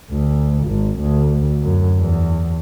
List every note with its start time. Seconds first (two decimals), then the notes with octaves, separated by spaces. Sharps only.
0.11 D2
0.67 G#1
1.00 D2
1.62 F#2
1.98 E2